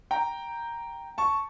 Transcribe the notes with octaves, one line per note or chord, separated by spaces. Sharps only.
G5 A#5
A5 C#6